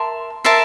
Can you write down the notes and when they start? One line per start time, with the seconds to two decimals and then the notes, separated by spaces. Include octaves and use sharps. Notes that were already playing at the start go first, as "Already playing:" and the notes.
Already playing: A#4 E5 A5 C6
0.44 A#4 E5 A5 C6